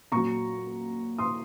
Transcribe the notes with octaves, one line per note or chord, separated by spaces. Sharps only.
A#2 F#3 A#5 C#6
C6 D#6